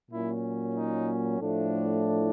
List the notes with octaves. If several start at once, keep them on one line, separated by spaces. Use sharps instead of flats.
A#2 F#3 A#3 C#4 E4
D#4
A2 F3 A3 D4
E4